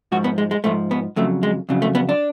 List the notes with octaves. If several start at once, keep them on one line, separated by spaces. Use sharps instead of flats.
G#2 F3 F#4
B3
G#3
G#3
G#2 F3 A3
B3
F2 C#3 F#3 A3
G#3
F2 C#3 F#3
A3
B3
D4